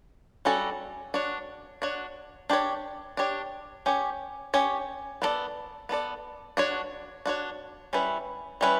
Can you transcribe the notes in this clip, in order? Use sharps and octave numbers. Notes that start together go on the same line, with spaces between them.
G3 C#4 F#4 A4
D4 F#4 C#5
D4 F#4 C#5
D4 G4 C#5
D4 G4 C#5
C#4 G4 C#5
C#4 G4 C#5
B3 D4 A4 D5
B3 D4 A4 D5
D4 F#4 C#5
D4 F#4 C#5
G3 C#4 E4 B4
G3 C#4 E4 B4